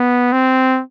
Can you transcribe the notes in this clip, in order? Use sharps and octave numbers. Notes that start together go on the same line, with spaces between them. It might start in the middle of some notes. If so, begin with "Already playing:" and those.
Already playing: B3
C4